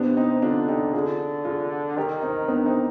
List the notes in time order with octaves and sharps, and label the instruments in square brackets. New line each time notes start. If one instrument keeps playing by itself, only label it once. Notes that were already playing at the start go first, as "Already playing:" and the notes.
Already playing: [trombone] C3 [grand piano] B3 D4
[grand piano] C4 D#4
[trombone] D3 [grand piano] D4 F4
[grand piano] D#4 G4
[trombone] D3 [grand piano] F4 G#4
[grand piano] F4 G#4
[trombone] D#3 [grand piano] D#4 G4
[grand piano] C4 D#4
B3 D4
C4 D#4